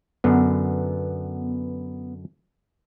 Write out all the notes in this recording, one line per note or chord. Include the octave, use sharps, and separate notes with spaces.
F#2 D3 B3